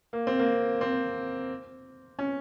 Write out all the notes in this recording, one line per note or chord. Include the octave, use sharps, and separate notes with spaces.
A#3
C4
A#3
C4
C#4